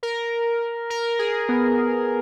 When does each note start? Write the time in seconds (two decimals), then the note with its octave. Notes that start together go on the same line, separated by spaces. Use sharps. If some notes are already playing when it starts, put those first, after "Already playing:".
0.03 A#4
0.90 A#4
1.19 G#4
1.49 B3